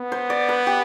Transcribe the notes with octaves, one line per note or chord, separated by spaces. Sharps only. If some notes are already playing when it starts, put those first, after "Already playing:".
Already playing: B3
C5
D5
B4
G4